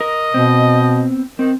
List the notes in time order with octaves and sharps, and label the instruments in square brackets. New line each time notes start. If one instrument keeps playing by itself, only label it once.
[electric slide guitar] A#4 [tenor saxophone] D#5
[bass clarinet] B2 [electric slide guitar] B3 C4
[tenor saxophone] D#3 [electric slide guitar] C4